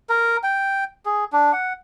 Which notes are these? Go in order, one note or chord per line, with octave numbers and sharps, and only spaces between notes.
A#4
G5
G#4
D4
F#5